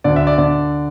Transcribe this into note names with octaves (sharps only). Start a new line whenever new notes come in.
D2 D3 D5
E5
D5
D3 D5